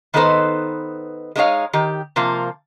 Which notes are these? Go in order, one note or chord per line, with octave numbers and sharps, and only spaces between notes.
D#3 B3 D#4 A4 B4 C5
G#3 A#3 D#4 E4 C#5 F5
D#3 G4
C3 F3 A#3 F4